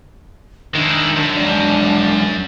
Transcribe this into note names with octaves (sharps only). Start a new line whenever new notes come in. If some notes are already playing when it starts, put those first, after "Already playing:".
D#3 G#3 D4 E4
F#2
E2 G#3 D4 D5